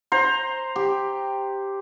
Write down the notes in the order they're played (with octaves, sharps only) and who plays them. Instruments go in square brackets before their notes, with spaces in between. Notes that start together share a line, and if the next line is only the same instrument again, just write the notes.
[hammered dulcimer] C5 A#5
G4